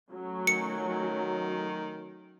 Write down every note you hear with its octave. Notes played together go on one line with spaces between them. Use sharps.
F#3 A3 C#4
D#3 C#7
D#3